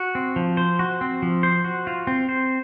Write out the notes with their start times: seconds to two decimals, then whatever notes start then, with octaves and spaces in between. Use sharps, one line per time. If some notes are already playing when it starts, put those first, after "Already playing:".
Already playing: F#4
0.15 C4
0.36 F3
0.57 C5
0.79 F#4
1.01 C4
1.22 F3
1.43 C5
1.64 F#4
1.87 F4
2.07 C4
2.29 C5